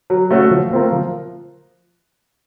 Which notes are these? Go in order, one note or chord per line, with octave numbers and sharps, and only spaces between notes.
F#3
A3 C#4 F#4
F3
A3 C4 F4 A#4
F3